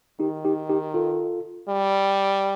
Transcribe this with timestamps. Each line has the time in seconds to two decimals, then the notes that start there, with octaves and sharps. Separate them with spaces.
0.20 D#3 D#4 G4
0.45 D#4 G4
0.69 D#4 G4
0.94 F4 A4
1.69 G3